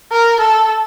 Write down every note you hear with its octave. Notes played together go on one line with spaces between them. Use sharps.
A#4
A4